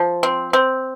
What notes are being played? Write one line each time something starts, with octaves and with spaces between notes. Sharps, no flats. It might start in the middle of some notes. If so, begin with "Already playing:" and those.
Already playing: F3
C4
C4